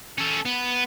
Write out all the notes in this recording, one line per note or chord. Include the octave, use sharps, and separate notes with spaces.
C#4 A4
B3